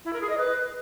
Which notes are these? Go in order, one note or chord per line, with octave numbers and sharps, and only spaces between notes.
E4
A#4
G#4
D#5
B4